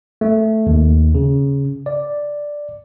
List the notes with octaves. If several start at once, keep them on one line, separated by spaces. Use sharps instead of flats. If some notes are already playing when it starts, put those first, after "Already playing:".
A3
D#2
C#3
D5